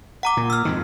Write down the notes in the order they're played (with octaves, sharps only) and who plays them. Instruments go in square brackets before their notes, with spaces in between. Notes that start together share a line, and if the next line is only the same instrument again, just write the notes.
[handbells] F#5 A#5 D6
[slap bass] A#2
[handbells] E6 F6
[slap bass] F2 G#2 D#3